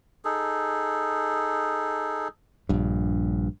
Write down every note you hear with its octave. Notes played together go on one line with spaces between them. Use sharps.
D#4 G#4 A4
A#1 G2